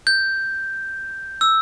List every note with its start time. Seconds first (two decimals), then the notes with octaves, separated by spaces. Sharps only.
0.07 G6
1.41 E6